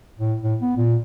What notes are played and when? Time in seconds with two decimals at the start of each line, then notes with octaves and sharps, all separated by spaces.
0.18 A2
0.42 A2
0.61 B3
0.76 A#2